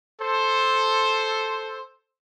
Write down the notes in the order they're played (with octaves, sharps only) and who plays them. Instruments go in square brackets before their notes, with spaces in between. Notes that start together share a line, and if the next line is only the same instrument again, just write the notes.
[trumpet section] A4 C5